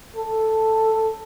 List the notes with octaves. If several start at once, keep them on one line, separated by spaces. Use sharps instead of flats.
A4